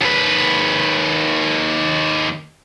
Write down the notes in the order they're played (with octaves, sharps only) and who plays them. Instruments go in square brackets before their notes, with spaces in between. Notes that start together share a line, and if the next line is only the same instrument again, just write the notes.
[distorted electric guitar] D#2 B4